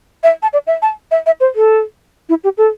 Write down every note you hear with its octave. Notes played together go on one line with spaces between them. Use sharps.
E5
A5
D5
E5
A5
E5
E5
C5
A4
E4
G4
A4